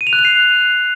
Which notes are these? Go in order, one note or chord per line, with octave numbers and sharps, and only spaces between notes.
D#7
F7
F#6
F7
C7